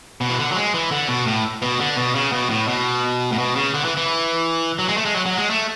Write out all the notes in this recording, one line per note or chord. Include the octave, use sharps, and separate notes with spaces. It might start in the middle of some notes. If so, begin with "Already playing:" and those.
B2
E3
D3
F#3
G#3
E3
D3
B2
A2
B2
D3
B2
C#3
B2
A2
B2
A2
B2
C#3
D3
E3
E3
F#3
G#3
A3
G#3
F#3
F#3
G#3
A3